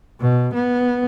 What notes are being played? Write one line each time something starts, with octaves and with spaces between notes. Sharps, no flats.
B2
B3